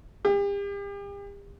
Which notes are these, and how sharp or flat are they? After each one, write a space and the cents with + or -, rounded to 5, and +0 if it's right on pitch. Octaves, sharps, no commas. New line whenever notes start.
G4 +40